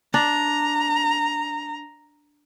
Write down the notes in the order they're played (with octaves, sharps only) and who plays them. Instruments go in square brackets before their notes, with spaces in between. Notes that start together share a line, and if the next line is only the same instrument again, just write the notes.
[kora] D4 [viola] A#5